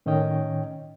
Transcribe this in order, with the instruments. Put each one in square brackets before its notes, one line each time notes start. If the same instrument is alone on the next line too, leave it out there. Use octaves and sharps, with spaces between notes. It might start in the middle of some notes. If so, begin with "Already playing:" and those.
[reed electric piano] A2 D#3 C#4 C#5 D#5 G5